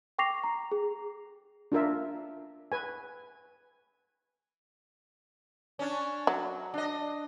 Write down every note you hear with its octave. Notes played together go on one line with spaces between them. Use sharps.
G5 C#6 D6 A#6 C7 F7
A#5
G#4
D4 F4 A#4 E5
B4 G#5
C#4 D4
F#3
D4 D#5